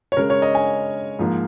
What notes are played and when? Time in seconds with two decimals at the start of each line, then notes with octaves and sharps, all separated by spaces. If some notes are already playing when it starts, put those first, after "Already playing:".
0.12 C#5
0.17 C#3 G#3 A#4
0.30 C#5
0.42 D#5
0.55 G#5
1.19 G#2 F3 A#3